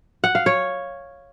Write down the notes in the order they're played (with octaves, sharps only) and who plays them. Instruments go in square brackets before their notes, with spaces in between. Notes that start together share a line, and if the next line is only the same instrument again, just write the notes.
[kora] F#5
F5
C#5